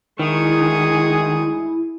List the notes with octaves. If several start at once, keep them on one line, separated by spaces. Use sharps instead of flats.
D2 D#3 G#3 E4 G#4 C#6 D#6